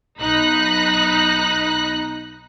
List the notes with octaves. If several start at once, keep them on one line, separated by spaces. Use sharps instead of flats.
B1 D#4 B5 F#6 A#6